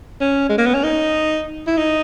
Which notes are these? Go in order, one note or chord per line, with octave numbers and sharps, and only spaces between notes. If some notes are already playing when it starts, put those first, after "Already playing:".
C#4
G#3
A#3
B3
C#4
D#4
E4
D#4